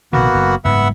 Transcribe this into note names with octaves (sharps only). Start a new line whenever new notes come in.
A#1 C3 D#3 A#3 B3 F#4
F#1
F#1 G#2 G#3 B3 E5 F#5